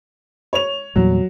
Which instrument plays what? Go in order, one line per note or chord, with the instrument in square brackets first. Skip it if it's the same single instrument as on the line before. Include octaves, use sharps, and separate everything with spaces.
[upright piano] C#5 F7
[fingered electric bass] E2 A#2 G3 [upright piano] F#3